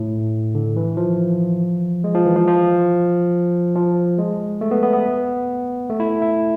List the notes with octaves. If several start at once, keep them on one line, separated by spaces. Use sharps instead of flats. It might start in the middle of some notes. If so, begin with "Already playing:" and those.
Already playing: A2
D3
E3
F3
G#3
F3
E3
F3
F3
F3
G#3
A3
B3
B3
B3
A3
E4
E4